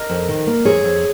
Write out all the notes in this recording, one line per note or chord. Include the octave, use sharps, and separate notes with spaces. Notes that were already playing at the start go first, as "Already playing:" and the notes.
Already playing: A#4 D#5
F2
D#3
A#3
F2 G#4 C#5
F2